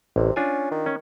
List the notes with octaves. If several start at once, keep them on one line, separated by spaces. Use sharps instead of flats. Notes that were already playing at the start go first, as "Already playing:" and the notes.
A1 C3
C#4 D4 F4 G#5
D#3
C#4